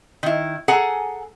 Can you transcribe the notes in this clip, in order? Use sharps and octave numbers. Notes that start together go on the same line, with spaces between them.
D#3 E4
G#4 A4 F#5 G#5 A#5